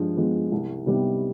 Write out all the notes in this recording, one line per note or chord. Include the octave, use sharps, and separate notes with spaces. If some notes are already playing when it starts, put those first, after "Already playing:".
Already playing: G2 F3 G#3
F3 G#3 B3
C2
C3 G3 B3 D#4